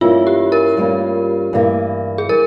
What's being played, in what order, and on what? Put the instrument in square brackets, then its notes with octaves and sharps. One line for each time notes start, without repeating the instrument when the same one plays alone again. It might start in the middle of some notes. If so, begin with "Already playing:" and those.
[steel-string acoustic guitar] G2 E3 A#3 C#4 E4 [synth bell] F4
[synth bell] G4
A#4
[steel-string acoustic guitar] G2 G3 A#3 C#4
G2 E3 A#3
[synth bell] G#4
[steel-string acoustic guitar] E3 G3 [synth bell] A#4